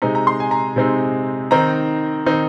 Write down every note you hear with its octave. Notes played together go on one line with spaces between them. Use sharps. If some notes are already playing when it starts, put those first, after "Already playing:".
C3 G#3 C4 D#4 A#5
A#5
C6
G#5
A#5
C3 G#3 C4 D#4
D#3 C4 D#4 A#5
D#3 C4 D#4